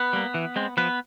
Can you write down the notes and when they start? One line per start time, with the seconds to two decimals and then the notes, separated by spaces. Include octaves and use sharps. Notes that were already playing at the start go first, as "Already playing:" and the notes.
Already playing: B3 B4
0.13 G3 A#3
0.34 E3
0.56 G#3 C4
0.77 F3 B3 B4